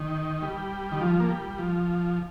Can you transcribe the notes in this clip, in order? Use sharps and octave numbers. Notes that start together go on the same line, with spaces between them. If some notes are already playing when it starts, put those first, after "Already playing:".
Already playing: D#3
G3
D#3
F3
A#3
G3
F3